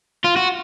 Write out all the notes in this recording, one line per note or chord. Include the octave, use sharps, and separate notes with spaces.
F4
F#4